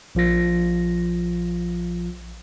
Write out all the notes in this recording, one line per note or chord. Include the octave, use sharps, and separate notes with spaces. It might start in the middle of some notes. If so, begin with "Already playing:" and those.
A#1 F3 F4 A#6